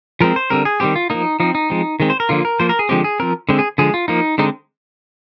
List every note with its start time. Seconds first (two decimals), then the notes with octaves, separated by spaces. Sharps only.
0.21 F3 G#3 C4 A#4
0.36 C5
0.50 D3 G3 C4 A#4
0.65 G#4
0.80 D#3 G3 C4 G4
0.96 F4
1.10 F3 A#3 D#4
1.40 F3 C4 D#4
1.55 D#4
1.70 F3 G#3 C4
2.00 D#3 G#3 C4
2.10 C5
2.20 A#4
2.29 D3 F3 A#3 F4
2.45 A#4
2.60 F3 A#3 C5
2.69 A#4
2.79 G#4
2.89 D3 F3 G#3 C4 G4
3.04 G#4
3.20 F3 C4 A#4
3.49 D3 G#3 C4
3.59 G#4
3.78 D3 F3 G#3 G#4
3.94 F4
4.08 F3 A#3 D#4
4.38 D3 G#3 C4 D#4